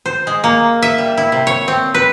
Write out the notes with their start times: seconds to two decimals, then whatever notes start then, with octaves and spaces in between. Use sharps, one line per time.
0.06 C5
0.27 G#3
0.44 A#3
0.82 E5
0.98 G3
1.17 E4
1.32 C3
1.47 C#5
1.68 C4
1.94 B4